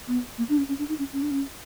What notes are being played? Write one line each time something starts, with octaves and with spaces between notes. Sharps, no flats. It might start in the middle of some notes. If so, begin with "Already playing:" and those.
B3
A#3
D4
C#4
C#4
D4
D#4
C#4
C#4
D4
C#4